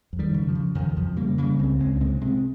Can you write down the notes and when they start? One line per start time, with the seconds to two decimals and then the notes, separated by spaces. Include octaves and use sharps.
0.13 F2
0.19 D#3 G3
0.34 C#3
0.48 F3
0.55 C#3
0.75 F2 D#3
0.96 F2 F3
1.16 C#3 G3 A#3
1.38 C#3 G3 A#3
1.59 C#2 G#3 C4
1.79 C#2 G#3 C4
1.96 C#4
2.01 C3 G#3 C4
2.21 C3 G#3 C4